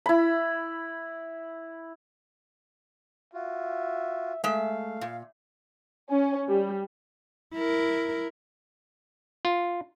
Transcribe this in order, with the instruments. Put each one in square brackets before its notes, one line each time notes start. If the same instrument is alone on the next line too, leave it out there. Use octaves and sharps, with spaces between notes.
[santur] E4 B5
[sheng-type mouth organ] F4 F#4 [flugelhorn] E5
[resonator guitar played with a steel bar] G#3 E5 [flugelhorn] A3 [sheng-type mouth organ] F5
[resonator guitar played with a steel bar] A#2
[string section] C#4
G3
[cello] E4 A#4
[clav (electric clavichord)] F4